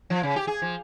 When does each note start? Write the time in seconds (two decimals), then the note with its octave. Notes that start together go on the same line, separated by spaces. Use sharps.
0.10 F3
0.23 C#3
0.36 G4
0.47 G#4
0.62 F3